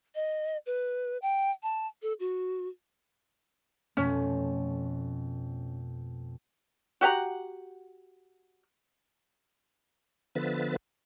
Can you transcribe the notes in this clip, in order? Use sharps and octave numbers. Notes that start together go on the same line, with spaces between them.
D#5
B4
G5
A5
A4
F#4
F2 B2 A3 C#4
F#4 G4 F#5 A#5
D3 F3 B3 B4 E5 A6